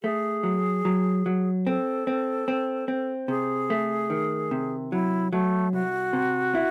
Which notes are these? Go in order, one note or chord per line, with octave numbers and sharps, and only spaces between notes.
A3 G#4
F#3
F#3
F#3
C4 A4
C4
C4
C4
C3 G#4
A3
D#3
C3
F#3 E4
F#3 A3
C2 F#4
C3
E4